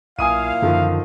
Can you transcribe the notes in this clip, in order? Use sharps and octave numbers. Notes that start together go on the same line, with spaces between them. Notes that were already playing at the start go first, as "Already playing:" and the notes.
B1 A#2 E4 F5 G#5 D#6 D#7
F#2 D3 D#3 F3